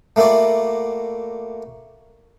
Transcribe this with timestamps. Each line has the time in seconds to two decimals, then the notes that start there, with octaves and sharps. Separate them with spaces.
0.16 A3 A#3 E4 F#4 D5